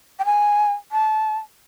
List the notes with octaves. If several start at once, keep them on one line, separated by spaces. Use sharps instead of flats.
G5
G#5
A5